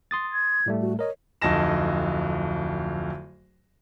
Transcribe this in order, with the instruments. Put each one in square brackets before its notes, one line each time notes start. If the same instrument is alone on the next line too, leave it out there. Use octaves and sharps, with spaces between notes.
[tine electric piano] C6 D#6 A6
[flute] G#6
[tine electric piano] A2 G3 A3
[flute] F#4
[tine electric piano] A#4 D#5 [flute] C#5
[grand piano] D1 F2 D#4 A5 A#6 E7